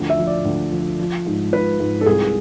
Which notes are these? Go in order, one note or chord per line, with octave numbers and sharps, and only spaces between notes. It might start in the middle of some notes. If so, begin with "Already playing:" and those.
Already playing: D2 F3
E5
F3
D5
D2
F3
F3
G#2
F3 B4
G#2
A4
C2 G#4